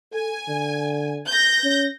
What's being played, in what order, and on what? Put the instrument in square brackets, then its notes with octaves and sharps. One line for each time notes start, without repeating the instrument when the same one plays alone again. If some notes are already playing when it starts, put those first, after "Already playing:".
[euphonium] A4 [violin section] G#5
[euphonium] D3
[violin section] G6 A#6
[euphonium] C#4